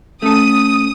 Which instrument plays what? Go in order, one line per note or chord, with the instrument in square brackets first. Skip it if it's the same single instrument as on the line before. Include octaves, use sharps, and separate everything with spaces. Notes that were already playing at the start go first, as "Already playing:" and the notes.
[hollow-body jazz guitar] A3 A4 [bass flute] C#4 [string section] D#6